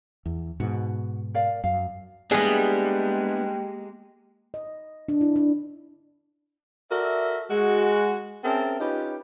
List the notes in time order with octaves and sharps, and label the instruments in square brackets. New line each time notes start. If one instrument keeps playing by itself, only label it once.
[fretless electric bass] E2
[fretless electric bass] G#2 B2 [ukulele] F#4
[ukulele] A#4 D5 F5
[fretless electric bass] F#2 [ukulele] F5
[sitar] G3 [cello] G#3 A#3 [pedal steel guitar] B3 D4 E4 [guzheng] G#4 D#5
[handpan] D#5
D4
E4
D4
[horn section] F#4 A4 A#4 D5 E5
G#3 F#4
C4 C#4 G#4 A#4 E5 A5
C#4 D#4 F4 G4 B4